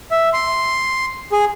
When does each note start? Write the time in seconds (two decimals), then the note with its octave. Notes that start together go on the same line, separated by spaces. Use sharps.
0.11 E5
0.33 C6
1.32 G#4